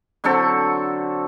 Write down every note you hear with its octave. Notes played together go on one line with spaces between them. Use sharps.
D3 F#3 C4 A4